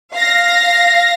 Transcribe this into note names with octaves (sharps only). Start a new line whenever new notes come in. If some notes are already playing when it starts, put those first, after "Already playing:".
F5 A#6